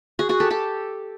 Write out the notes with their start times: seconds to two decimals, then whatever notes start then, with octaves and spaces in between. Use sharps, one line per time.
0.19 F#4 G#4
0.29 F#4 G#4
0.40 G4 A4
0.50 G4 A4